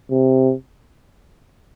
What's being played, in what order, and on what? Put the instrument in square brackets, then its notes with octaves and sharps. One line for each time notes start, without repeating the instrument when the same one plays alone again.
[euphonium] C3